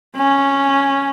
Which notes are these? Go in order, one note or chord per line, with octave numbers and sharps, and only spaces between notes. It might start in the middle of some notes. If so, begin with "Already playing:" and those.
C#4